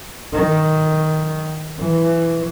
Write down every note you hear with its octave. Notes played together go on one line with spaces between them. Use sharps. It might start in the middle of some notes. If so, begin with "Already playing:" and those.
D#3
E3